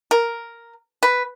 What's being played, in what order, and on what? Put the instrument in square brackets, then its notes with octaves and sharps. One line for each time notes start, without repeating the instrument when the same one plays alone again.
[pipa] A#4
B4